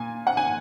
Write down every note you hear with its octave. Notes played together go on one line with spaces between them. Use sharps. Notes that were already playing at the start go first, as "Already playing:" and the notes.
Already playing: A#2 G#5
F#5
G#5